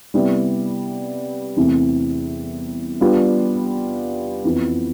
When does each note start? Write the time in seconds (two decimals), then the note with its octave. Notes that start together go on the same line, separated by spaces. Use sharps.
0.14 C3 G3 B3 E4
1.57 E2 C3 E3 A3 C4
3.00 G3 B3 D4 F4
4.44 F2 E3 B3